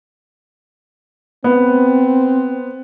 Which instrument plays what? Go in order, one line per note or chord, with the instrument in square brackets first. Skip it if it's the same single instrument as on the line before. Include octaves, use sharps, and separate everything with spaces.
[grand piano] B3 [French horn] C4